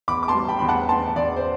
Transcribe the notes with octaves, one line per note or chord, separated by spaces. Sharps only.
E2 B5 D6
D6
A5 C6
G3
G5 B5
E2 B5
F#5 A5
E2 A5 C6
E2 D5
C5